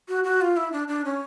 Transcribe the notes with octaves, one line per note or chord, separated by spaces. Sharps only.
F#4
F#4
F4
E4
D4
D4
C#4